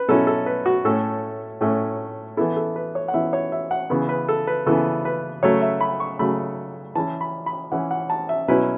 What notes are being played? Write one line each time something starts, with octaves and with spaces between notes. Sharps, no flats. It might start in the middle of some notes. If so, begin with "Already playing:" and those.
Already playing: B4
B2 F#3 C#4 E4 A4
A4
B4
F#4
A2 A3 C#4 A4
A2 A3 C#4
E3 B3 E4 A4
A4
B4
C#5
F#5
E3 B3 E4 E5
C#5
E5
F#5
C#3 E3 B3 E4
B4
A4
B4
C#3 E3 B3 E4 A4
B4
C#3 F#3 A3 C#5
E5
B5
C#6
C#3 F#3 A3 B5
E3 C#4 E4 A5
B5
B5
E3 C#4 E4 F#5
F#5
A5
E5
B2 F#3 C#4 E4 B4